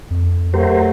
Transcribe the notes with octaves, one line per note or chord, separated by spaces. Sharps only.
F2
F#3 A3 G4 A#4 C5